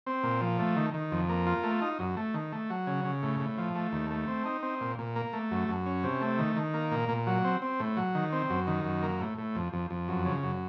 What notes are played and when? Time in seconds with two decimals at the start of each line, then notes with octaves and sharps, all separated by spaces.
0.06 C4
0.23 A#2
0.41 F3
0.59 A3
0.76 D#3
0.94 D#3
1.11 F2
1.29 A#3
1.47 F4
1.64 A3
1.82 D#4
1.99 F#2
2.17 A3
2.34 D#3
2.52 A3
2.70 F#3
2.87 C#3
3.05 C#3
3.22 A2
3.40 A2
3.58 F3
3.75 A3
3.92 D#2
4.10 A3
4.28 C4
4.45 D#4
4.62 C4
4.81 A#2
4.99 A#2
5.16 A#3
5.33 A3
5.51 F#2
5.68 F#2
5.86 C#4
6.04 C3
6.21 A3
6.39 D#3
6.56 D#3
6.74 A#3
6.92 A#2
7.09 A#2
7.27 F#3
7.44 C4
7.62 C4
7.80 A2
7.97 F#3
8.15 D#3
8.32 C4
8.50 F#2
8.67 D#3
8.85 F#2
9.03 A#3
9.20 A2
9.38 A2
9.55 F2
9.73 F2
9.90 F2
10.08 F#2
10.25 C#3
10.43 F#2